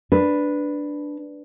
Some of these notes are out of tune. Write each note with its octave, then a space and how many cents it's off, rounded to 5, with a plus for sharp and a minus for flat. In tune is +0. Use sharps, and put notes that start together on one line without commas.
D4 +0 B4 +0